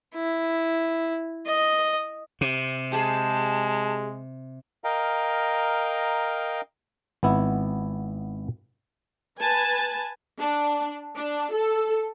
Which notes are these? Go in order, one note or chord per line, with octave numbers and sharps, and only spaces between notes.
E4
D#5
C3
G#3 G4 G#4 A5
A#4 D#5 F5 G5 A#5
G#1 B3 E4
B4 G#5 A5
D4
D4
A4